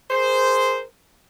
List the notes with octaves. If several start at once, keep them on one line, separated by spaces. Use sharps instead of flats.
G#4 A#4 C5